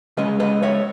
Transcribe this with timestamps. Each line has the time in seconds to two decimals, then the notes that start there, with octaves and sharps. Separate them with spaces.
0.17 C#3 G#3 C#4 B4 D#5
0.40 B4 D#5
0.63 C#5 E5